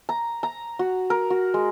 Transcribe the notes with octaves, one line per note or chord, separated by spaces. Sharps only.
A#5
A#5
F#4
A#4
F#4
G#3